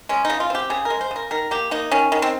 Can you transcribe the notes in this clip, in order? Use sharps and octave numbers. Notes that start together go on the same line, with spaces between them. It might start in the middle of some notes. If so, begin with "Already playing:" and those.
G#3 C#4
D#4
C#3
F4
C4 G4
C#3 G#4
A#4
G#3
C5
C#3 A#4
D#3 A#4
A#3 G4
A#3 D#4
D#3 C#4
D#3
C4